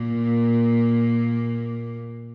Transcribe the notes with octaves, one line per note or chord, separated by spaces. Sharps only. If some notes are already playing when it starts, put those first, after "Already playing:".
Already playing: A#2 A#3